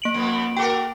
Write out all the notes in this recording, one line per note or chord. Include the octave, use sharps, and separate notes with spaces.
A#3 D7 F#7
F2 B3
F#4 A4 A#4 G5 D6